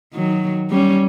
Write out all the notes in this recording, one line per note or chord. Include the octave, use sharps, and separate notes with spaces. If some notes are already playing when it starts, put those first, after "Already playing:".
D#3 F#3
G3 C#4